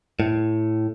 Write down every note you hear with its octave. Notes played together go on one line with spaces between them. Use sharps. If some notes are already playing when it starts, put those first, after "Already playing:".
A2